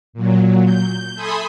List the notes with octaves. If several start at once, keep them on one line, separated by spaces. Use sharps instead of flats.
A#2 F#3
G6
A4 E5 G#5 B5 C6 D#6